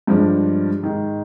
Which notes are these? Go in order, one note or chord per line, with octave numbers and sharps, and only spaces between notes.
G2 F3 G#3 D4
G#2 D#3 G#3